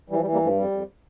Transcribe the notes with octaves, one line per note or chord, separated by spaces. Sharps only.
E3 G3
F3
G3
E3
G3 A#3
G2 F3 A3
F2 G3
F2